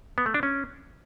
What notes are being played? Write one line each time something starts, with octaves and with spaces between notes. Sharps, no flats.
B3
A3
D4
C#4